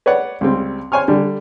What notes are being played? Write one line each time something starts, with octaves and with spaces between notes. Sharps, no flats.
B4 C#5 D5 F#5
C#2 G3 C4
C5 C#5 G#5 C#6 F6
D3 G3 D4